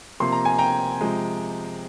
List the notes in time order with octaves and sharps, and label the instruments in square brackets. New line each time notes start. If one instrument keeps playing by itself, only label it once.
[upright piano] C3 F3 A#3 C6
A#5
G#5
G5 A#5
C3 F3 G#3